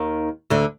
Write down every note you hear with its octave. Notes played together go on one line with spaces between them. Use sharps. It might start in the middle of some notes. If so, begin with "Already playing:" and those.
Already playing: D#2 D#3
D2 D3